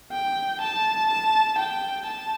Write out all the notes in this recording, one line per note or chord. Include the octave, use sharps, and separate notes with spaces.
G5
A5
A5
G5
A5